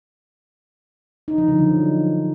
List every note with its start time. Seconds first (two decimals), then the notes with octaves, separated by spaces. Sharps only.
1.28 D#4
1.38 F3
1.48 D3
1.58 F#3